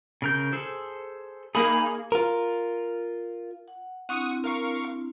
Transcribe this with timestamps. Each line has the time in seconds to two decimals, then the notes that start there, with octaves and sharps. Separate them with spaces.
0.22 C#3 A#4 G6
0.53 G#4 A4 C5
1.55 A#3 D#4 G#4 B5
2.12 F4 A#4
3.68 F#5
4.09 C4 D4 E4 F#5 C#6 D#6
4.44 A#4 F5 C#6